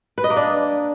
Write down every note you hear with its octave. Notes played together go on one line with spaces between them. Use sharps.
B4
D#5
A#3
D4